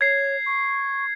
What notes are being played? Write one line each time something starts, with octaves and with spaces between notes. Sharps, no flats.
C#5 G#6 C7
C#6